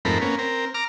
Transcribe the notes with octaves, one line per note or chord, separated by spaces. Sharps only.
F2 G#2 A3 C4 A#4 B5
A#3 B3 C#4
C4 A#4
A#5 D6 F6